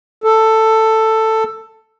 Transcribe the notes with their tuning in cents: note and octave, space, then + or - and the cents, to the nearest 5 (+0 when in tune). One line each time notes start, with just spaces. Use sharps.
A4 +10